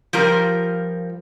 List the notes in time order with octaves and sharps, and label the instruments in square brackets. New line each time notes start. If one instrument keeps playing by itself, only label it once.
[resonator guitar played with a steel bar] F3 G3 F4 A#4